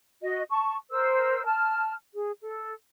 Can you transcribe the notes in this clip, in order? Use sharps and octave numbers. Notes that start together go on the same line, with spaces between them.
F#4 D#5
A5 C#6
A#4 C5 E6
A5 F6
G#4
A4